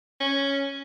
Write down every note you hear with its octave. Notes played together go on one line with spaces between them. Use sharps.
C#4